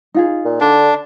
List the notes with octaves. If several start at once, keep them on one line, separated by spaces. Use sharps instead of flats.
D#4 F4 G#4
A#2
D3 D4